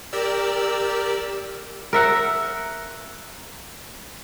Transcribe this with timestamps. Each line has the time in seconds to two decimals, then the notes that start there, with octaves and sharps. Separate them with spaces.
0.13 G4 A#4 D5 E6
1.93 A#4 E5 F#5